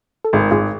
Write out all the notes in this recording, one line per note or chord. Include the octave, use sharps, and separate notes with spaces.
A4
G#1 F4 G#4
G#1 F4 G#4